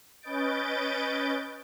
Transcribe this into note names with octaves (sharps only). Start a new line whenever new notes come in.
C#4 B4 D#5 G6 A6 D7